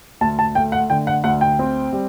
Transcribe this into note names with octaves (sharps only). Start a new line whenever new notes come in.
D2 A5
A5
A3 G5
F#5
D3 G5
F#5
D2 F#5
G5
C4
G3